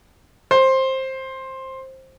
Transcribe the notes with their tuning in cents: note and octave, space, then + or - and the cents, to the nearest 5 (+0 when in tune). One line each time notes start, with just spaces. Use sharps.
C5 +15